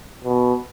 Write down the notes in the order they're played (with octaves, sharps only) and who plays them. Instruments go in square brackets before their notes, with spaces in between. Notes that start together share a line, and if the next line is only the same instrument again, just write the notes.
[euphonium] B2